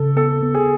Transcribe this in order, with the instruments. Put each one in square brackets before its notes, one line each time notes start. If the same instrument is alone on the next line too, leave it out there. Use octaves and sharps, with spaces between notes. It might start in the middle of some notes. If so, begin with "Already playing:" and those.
Already playing: [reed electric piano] C#3 [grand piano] A4
[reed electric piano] B3 [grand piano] A4
[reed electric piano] B3
[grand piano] G#4